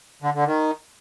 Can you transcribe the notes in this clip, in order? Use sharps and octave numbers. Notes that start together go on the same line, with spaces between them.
D3
D3
D#3